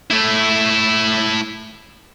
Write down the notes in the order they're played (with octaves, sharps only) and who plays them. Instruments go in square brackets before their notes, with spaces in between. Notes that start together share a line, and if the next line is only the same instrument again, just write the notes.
[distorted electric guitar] A3 E4